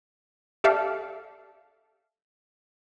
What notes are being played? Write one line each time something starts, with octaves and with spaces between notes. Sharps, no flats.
G4 A4 D5 E5 F5